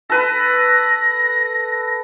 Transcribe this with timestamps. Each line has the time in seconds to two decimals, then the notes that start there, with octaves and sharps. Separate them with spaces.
0.10 A4 B4 A#6